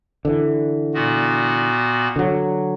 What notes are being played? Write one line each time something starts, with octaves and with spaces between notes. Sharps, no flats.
D3 E3
A#2 B3 F#4
D3 F#3